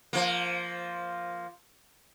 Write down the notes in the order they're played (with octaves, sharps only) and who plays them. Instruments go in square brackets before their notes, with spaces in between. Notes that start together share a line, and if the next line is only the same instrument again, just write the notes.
[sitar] F3 A#3